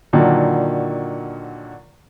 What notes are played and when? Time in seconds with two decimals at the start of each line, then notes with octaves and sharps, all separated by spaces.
0.13 A#2 D3 D#3 F#3